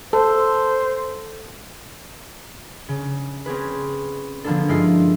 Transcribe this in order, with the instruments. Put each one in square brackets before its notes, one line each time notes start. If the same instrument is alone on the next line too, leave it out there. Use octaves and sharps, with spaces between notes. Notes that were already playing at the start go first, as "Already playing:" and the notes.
[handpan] A4 [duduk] C5
[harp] C#3
C4 C#4 G#4 B4
D3 F3 A#3 B3 D4 A4
G2 G#3 E4 F4 C7